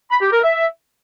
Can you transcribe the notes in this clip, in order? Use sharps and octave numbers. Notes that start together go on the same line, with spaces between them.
B5
G4
A#4
E5